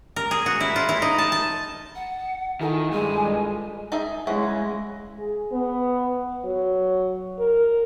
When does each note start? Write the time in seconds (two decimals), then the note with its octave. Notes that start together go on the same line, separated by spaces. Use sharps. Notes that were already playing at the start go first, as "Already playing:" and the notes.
0.16 A#4
0.31 G#4
0.46 F#4
0.61 E4
0.76 F4
0.89 E4
1.02 D#4
1.18 A5
1.32 A5
1.95 F#5
2.61 D#3 E4 F4 A4 G#5
2.91 G2 G#3 G#5
3.92 D#4 G#4 E5
4.27 C#3 G#3 C#4 E4 B4 F#5
5.19 G#4
5.52 B3
6.44 F#3
7.39 A#4